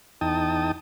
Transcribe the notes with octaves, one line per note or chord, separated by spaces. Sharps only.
E2 D#4 G5 A5 D#6